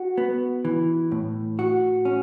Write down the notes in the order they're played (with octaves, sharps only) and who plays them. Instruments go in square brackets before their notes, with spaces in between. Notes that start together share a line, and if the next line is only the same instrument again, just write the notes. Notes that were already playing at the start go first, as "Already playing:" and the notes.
Already playing: [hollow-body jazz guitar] F#4
B3
E3
A2
F#4
C#4